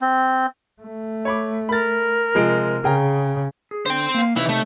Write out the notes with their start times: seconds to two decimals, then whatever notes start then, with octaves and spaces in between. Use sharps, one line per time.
0.01 C4
0.82 A3
1.25 C#5 B5 D6
1.69 A#4 B5 A6
2.35 C3 F3 G#3 D7
2.84 C#3 G#4 G5 A#5
3.71 G#4
3.86 D3 C5 G5
4.15 A#3 F5
4.36 C3 E3 D#4 E4 C#5
4.49 A3